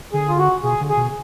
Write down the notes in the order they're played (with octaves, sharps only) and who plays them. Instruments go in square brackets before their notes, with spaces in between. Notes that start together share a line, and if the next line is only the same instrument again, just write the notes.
[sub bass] D3 [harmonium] G#4
[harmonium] F4
F#4
[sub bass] B2 [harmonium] G#4
[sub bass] D3
[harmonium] G#4
[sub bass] B2